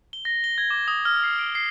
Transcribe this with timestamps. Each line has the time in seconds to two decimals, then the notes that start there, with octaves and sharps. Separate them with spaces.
0.13 G7
0.25 A#6
0.44 G7
0.58 G#6
0.70 D6
0.88 D#6
1.05 F6
1.24 C7
1.39 D7
1.55 C7